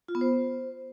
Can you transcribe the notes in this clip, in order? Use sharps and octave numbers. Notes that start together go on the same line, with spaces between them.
F4
B3
C5